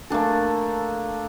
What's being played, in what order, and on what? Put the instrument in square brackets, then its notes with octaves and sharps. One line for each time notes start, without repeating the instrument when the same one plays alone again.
[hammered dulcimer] A3 A#3 D4 A4